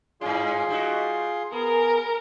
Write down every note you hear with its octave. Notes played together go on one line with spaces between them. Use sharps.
G2 C#4 F4 G#4 C6
G3 D#4 F#4
B3 G#4 A#4